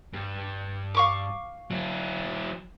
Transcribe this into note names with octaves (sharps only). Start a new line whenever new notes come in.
G2
F5 C#6 D6
F#3 E4